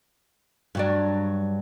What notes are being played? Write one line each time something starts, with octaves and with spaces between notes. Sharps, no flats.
G2 F#3 D4